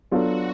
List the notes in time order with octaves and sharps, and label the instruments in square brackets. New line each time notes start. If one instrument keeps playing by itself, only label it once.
[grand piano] F#3 B3 D4 F4 A4 [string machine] F#4